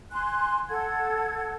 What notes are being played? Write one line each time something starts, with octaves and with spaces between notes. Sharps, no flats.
G#5 C6 F#6
A4 F#5 G#6